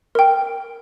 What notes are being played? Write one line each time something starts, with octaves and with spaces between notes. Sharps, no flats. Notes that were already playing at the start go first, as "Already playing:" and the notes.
A#4 G5